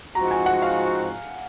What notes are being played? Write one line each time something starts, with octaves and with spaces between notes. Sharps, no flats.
G#2 F3 C4 F#4 A#5
G#5
F#5
F5